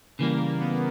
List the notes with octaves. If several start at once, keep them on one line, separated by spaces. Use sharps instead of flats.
C#3 E3 G3 A#3
B3